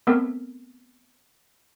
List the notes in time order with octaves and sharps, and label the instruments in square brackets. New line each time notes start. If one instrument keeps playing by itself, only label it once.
[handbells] A3 B3 C4 A4 A#4